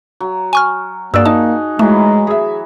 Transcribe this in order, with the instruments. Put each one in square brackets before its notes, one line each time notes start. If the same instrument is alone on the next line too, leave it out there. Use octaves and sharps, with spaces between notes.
[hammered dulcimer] F#3
[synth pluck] G#5 C#6 F6
[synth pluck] G2 D5 [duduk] A#3 [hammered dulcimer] F#4 G#4 [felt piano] E6
[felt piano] D#4 [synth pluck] A5
[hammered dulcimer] E3 F#3 E4 [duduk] G#3 [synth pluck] A3
[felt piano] G#4 E5